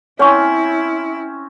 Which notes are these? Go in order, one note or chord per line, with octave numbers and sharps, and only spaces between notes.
C4 C#4 E4 C#5 F#5 C#6